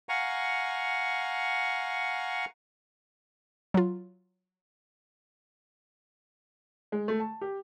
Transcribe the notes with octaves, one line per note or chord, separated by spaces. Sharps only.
F5 F#5 G#5 A#5 C#6
F#3 F4
G#3
A3
A5
G4